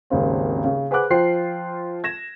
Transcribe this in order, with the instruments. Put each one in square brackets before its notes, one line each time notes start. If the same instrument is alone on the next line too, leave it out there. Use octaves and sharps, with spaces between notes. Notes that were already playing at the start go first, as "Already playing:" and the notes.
[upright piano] D#1 G#1 C#3 C4
C#3
G#4 B4 C5 F#5 D6 F#6
F3 F4 C5 G5 C7
G#6 A#6 E7